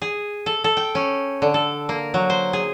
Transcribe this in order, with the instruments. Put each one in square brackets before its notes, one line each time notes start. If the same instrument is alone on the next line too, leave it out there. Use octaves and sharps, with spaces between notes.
[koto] G#4
A4
A4
G5
C#4
D3
A4
A#3
F#3
C5
G#4